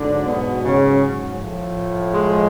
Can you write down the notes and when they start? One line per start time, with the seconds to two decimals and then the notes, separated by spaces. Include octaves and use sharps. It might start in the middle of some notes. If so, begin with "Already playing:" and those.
Already playing: G#2 D3 F#3 D4
0.25 B2 B3
0.63 C#3 C#4
1.38 A2 F3
2.13 G#3